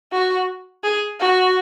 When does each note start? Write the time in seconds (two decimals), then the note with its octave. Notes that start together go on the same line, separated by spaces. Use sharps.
0.12 F#4
0.84 G#4
1.20 F#4